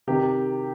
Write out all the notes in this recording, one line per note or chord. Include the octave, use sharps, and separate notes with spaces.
C3 D#3 G4